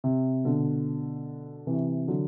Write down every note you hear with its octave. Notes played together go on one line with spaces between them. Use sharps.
C3
B2 D3
C3 E3
D3 F#3